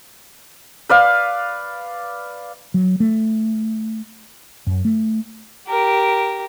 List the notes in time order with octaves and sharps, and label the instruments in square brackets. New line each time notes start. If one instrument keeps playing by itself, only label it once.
[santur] B4 D5 F5
[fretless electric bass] F#3
A3
F#2
A3
[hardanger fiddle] G4 A#4